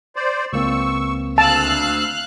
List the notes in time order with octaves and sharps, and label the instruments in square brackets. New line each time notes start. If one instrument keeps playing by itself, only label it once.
[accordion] C5 D5
[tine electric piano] C#2 A#3 C4 [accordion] C#6 E6
[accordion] D2 E6 [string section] F5 F#6 [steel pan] A5